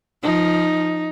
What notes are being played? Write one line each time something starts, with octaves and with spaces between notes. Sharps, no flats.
F3 D#4